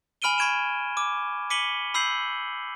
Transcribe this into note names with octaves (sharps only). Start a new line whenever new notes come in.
G#5 B5 F6 D7 D#7 G7
B5 C#6 G#6 D7 E7
D6
D6 B6 C#7 D#7 F#7 G7
B5 E6 G6 C7 F#7